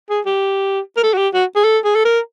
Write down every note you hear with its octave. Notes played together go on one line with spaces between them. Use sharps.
G#4
G4
A#4
A4
F#4
G4
F#4
G#4
A4
G#4
A4
A#4